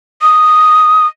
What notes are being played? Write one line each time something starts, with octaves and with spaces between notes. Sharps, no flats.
D#6